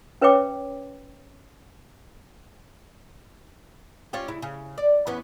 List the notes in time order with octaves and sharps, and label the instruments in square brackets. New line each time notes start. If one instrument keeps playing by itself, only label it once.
[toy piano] C#4 B4 C#5 E5 G5 D6
[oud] C#4 F4 G4
C#3 E4
C#3
D5
E2 B3 C#4